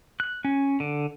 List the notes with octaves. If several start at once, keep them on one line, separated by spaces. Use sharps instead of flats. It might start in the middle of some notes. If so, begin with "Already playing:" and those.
F#6
C#4
D3